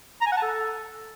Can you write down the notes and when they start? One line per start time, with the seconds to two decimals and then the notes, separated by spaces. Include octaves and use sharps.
0.21 A#5
0.27 G#5
0.32 F#5
0.37 A5
0.42 A4